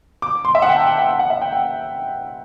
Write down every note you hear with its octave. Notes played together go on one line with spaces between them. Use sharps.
D6
C6
E5
F#5
G5
A5
G5
F#5
F#5
F#5
E5
G5
F#5